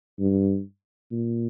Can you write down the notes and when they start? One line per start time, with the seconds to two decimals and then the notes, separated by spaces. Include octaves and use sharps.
0.19 G2
1.12 A#2